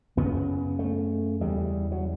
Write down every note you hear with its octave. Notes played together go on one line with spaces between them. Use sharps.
F#2 C#3 B3
A3
E2 C#3 G3
F#3